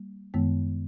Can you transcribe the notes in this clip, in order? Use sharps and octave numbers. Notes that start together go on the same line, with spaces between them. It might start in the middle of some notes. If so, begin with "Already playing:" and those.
Already playing: G3 A#3
F#2 D#3 G#3 B3